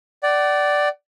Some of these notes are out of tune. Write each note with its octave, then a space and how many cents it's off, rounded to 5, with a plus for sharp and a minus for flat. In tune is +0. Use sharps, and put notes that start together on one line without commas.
D5 +0 F#5 +40